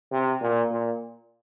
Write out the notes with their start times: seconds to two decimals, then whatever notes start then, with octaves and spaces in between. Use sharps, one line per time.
0.12 C3
0.41 A#2
0.71 A#2